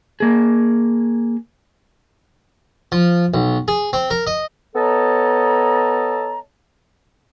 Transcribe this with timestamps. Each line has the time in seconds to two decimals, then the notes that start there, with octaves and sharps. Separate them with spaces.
0.20 A#3 G#4
2.92 F3
3.34 B1
3.68 G#4
3.93 C4
4.10 A#4
4.27 D#5
4.76 B3 A4 C#5 D#5 A5 A#5